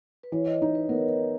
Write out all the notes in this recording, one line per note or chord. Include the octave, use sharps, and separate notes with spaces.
B4
E3 C#5
D#5
D#4
B4
B3 A#4